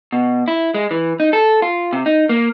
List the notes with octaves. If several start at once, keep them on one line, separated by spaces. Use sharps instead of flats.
B2
E4
G#3
E3
D#4
A4
F4
C3
D#4
A#3